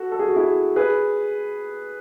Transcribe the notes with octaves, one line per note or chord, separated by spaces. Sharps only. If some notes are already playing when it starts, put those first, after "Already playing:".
Already playing: F#4 A4
A4
G#4
F#4
E4 G#4
G#4 B4